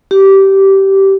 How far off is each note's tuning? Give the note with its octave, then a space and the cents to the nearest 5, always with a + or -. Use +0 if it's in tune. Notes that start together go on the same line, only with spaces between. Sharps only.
G4 -15